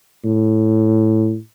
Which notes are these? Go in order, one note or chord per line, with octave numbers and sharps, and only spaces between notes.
A2